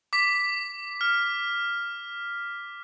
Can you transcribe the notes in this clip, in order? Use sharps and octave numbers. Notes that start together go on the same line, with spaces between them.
D6 B6
F6